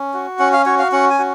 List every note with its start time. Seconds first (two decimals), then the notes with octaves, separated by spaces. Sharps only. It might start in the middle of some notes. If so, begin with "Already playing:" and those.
Already playing: C#4
0.14 F#4
0.39 C#4 F#5
0.53 F5
0.66 F#4 C#5
0.79 F5
0.92 C#4 F#5
1.10 G#5
1.19 F#4